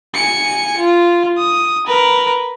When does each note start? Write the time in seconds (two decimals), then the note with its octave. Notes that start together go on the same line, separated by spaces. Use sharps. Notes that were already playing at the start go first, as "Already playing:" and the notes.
0.14 G#5 C#7
0.78 F4
1.38 D#6
1.87 A#4 B4